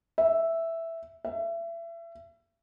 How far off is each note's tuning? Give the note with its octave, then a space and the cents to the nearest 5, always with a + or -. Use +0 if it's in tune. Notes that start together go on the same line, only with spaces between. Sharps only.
E5 +0
E5 +30